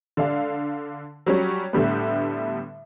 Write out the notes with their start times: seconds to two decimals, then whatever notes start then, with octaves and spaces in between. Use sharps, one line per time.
0.17 D3 D4 F5
1.26 F#3 G3 C#4
1.73 A2 D3 G3 B3